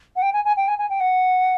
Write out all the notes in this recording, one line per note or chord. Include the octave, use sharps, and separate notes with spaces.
F#5
G5
G#5
G#5
G5
G#5
G#5
G5
F#5